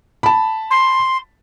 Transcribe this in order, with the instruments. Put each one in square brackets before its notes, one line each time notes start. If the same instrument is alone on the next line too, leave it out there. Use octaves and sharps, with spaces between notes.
[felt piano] A5 B5
[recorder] C6